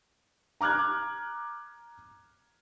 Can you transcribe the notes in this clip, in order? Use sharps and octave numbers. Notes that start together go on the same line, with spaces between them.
A#5 D6 F6 F#6 G#6